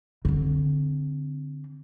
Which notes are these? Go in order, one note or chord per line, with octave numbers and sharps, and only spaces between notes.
D3 C4